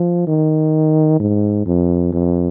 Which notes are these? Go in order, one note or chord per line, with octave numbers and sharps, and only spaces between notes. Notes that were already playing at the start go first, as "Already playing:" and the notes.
Already playing: F3
D#3
G#2
F2
F2